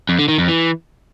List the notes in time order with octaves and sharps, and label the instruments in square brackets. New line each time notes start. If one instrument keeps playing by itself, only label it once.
[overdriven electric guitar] F2
D3
D#3
F2
E3